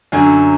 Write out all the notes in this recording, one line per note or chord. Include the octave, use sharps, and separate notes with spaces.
F#2 D3 F#3 G#5